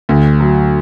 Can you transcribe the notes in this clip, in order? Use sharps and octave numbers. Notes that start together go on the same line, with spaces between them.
D2
F#3